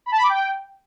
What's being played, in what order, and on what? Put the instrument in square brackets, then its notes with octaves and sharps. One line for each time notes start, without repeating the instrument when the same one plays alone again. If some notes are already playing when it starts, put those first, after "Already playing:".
[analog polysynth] B5
A5
B5
D6
G5